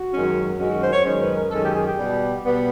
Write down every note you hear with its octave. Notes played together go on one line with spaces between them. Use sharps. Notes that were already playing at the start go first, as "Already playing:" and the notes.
Already playing: F#4
F#2 D#3 G#3 C#4
F#2 D#3 G#3 C#4 F#4
F#4
C5
C#5
F#2 D#3 G#3 C#4 C5
B4
A#4
F#2 D#3 G#3 C#4 A4
G4
G#4
G4
B2 G3 B3
B2 G3 B3